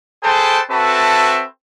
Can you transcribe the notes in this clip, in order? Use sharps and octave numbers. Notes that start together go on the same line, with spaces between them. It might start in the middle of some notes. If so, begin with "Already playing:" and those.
G#4 A4 B4 C5 G5 A5
C4 F#4 A4 B4 E5 A5